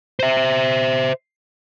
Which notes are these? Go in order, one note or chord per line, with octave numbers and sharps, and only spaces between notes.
C5 E5